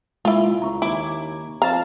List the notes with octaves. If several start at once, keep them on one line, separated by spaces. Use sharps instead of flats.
A#2 G#3 A#3 E4 F4 F5
C#2 A#5 C#6
D#2 E4 D6 G#6
F2 F5 A5 A#5